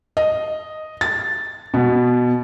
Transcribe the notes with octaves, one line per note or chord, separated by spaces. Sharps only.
D#5
A6
B2